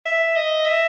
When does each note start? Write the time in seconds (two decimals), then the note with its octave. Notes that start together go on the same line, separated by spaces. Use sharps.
0.05 E5
0.36 D#5
0.65 E5